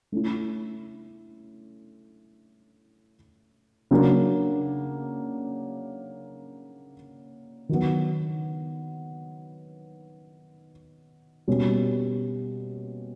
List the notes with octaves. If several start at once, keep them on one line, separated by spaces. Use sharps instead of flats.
A3 C#4 E4
C#3 F#3 A#3 D4
D#3 F#3 B3
B2 G3 A#3 C#4